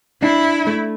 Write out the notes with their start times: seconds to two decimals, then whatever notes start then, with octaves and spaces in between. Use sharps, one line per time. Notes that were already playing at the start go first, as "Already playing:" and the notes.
0.23 D4 E4
0.67 A3